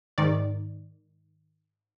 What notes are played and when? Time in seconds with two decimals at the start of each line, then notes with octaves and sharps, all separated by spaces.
0.18 G#2 D#3 D5